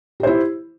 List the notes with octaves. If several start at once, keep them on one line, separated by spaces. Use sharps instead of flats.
E4 G4 C5